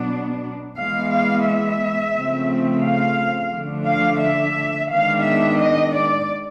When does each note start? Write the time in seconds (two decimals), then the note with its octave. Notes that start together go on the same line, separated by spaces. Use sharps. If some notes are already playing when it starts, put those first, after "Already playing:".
Already playing: B2 F#3 B3 D4
0.77 E3 G#3 B3 F5
1.12 F5
1.46 E5
2.15 C#3 F3 A3 C4
2.84 F5
3.53 D3 F3 A3 D4
3.87 F5
4.21 E5
4.91 D#3 G#3 B3 D4 F5
5.26 E5
5.60 D#5
5.94 D5